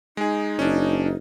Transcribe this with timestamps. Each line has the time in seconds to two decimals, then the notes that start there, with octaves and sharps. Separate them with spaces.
0.17 G#3 D#4 G#4
0.59 F#1 C#4 D4